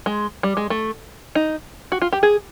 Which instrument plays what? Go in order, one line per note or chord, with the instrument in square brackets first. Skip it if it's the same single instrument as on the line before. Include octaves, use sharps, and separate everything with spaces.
[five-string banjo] G#3
G3
G#3
A3
D#4
F#4
F4
G4
G#4